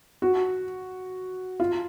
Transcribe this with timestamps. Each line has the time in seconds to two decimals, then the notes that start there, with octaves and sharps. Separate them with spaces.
0.22 F#4
1.60 F4